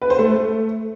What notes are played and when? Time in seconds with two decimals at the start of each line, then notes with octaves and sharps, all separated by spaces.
0.02 B4
0.10 C5
0.19 A3